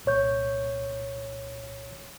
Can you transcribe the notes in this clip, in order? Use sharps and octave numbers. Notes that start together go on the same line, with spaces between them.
C2 A#2 C#5 G6